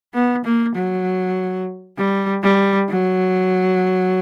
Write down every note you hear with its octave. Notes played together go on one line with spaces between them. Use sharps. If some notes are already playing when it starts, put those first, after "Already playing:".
B3
A#3
F#3
G3
G3
F#3